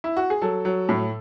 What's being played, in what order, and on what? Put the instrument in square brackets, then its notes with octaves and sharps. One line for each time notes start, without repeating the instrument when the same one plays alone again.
[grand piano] E4
F#4
G#4
F#3 A4
F#3
A2